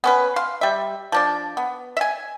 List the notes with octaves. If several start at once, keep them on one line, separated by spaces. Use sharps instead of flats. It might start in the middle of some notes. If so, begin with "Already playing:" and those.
B3 C#4 B4
F5 C6
G3 E5
F3 D4 D5
B3
E5 G#5